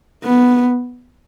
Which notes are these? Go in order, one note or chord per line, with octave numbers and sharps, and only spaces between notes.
B3